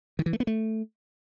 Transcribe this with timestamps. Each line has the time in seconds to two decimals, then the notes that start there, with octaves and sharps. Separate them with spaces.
0.19 D#3
0.26 E3
0.33 A3
0.40 B3
0.47 A3